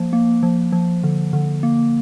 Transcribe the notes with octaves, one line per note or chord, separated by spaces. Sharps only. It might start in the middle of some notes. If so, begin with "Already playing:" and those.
Already playing: F3 A#3
A#3
F3
F3
D3
D3
A#3